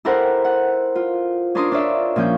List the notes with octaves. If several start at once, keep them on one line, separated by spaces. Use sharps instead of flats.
E4 G4 A4 A#4 C5 F#5
F#5
F4
C#4 D4 A#4 C6 D6 D#6
D4 F4 C#5 D5 E5
A#2 F3 C#4 G6